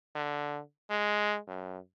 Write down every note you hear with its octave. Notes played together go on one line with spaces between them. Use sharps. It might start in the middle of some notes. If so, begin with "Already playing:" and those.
D3
G#3
F#2